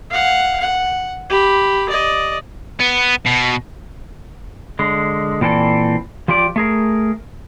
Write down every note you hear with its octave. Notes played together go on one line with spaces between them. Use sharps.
F5 F#5
F#5
G4 B5
D5 D#5
B3
B2
D3 G#3
A#2 E3 C4 A4 D5
F3 F4 G4 D5
A3 G#4 A#4